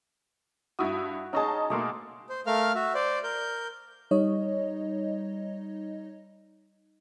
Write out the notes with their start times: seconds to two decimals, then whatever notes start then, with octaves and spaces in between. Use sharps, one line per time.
0.79 G2 E4 F#4 D#6
1.33 C#4 D#4 G#4 D#5 A5
1.70 B2 A3 A#3 C6 D6 D#6
2.29 C5
2.47 A3 A#4 F5 F6
2.75 F#4 E5
2.94 C5 D5
3.24 A#4 G6
4.11 G3 D#4 C#5 D#5